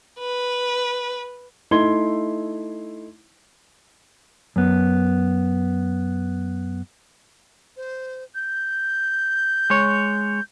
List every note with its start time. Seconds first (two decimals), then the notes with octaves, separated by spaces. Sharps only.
0.19 B4
1.71 A3 D#4 E4 C6 G#6 G7
4.56 F#2 B3
7.77 C5
8.35 G6
9.70 G#3 C#5